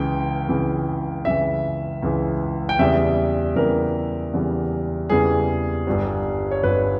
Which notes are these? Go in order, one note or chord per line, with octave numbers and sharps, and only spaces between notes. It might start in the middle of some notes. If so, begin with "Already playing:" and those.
Already playing: C#2 C#3 E3 G5
C#2 C#3 E3
C#2 C#3 E3 E5
C#2 C#3 E3
G5
E2 C#3 E3 G3 E5
E2 C#3 E3 G3 A#4
E2 C#3 E3 G3
E2 C#3 E3 G3 G#4
G1 G2 G3
C#5
G1 G2 G3 B4